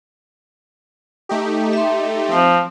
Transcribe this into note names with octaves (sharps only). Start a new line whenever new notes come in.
A3 D#4 G4
E5 C6
F3 C4